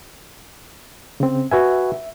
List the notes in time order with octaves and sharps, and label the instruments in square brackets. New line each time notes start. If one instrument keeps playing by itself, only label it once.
[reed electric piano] C#3 C4
[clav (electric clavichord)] F#4 B4 G#5 [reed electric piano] E5